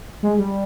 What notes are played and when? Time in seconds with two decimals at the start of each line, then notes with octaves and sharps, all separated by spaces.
0.23 G#3
0.38 G3